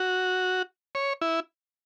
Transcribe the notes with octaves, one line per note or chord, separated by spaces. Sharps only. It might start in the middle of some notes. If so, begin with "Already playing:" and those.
Already playing: F#4
C#5
E4